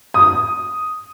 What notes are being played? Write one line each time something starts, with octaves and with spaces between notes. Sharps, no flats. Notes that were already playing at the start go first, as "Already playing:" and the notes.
D#6